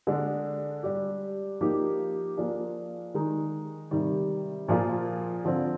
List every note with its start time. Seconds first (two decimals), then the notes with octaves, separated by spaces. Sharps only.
0.07 D3 G#3 D4
0.83 G3 D4 G4
1.61 F3 A#3 D#4 G4
2.37 F3 A#3 D4 F4 G#4
3.14 D#3 G#3 D#4
3.91 C3 D#3 G3
4.68 A#2 F3 A#3 F4 G#4
5.45 D3 F3 C4